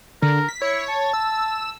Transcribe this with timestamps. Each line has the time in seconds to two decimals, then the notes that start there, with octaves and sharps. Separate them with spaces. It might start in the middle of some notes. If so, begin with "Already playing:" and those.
0.22 D3 A#4
0.49 B6
0.62 E4 C#5
0.88 A5
1.13 E6